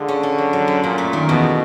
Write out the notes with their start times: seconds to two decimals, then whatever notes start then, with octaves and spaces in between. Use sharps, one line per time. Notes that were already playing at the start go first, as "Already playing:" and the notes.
Already playing: D3 G#3 F4 G#4
0.08 C#4
0.23 C#4
0.38 F#3
0.53 F#3
0.68 F#2
0.83 F#2 A#2
0.98 A3
1.13 D#3
1.28 E2 B2